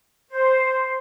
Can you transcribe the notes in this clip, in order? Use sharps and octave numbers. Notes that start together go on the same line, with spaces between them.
C5